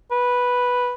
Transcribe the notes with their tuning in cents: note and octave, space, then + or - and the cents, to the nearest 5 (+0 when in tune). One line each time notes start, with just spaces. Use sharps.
B4 -5